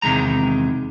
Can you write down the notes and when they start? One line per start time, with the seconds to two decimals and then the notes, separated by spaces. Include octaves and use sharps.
0.02 E2 C3 D#3 G#3 A#5